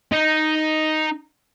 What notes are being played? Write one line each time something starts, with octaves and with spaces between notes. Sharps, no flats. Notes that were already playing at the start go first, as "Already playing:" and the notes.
D#4